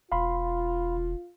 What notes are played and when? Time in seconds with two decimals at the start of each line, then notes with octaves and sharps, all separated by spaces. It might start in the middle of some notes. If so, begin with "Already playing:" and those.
0.12 E1 F4 F5 B5 C6